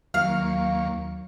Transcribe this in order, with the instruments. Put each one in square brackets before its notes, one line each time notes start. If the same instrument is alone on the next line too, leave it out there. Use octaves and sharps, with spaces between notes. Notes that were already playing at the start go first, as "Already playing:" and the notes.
[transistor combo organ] D#2 A#3 C#6 [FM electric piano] F#3 [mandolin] F5